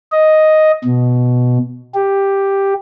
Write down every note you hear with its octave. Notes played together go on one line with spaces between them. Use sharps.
D#5
B2
G4